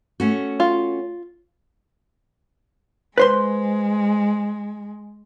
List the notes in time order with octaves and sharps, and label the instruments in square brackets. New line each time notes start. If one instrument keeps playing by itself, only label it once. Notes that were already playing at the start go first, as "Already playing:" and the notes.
[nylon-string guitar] A3 C#4 F#4
[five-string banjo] F4
[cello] G#3 [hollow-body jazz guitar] B4 C5 C6